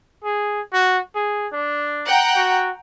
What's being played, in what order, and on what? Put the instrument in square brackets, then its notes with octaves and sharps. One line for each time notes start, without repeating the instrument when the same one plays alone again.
[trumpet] G#4
F#4
G#4
D4
[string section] F#5 G5 A#5
[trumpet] F#4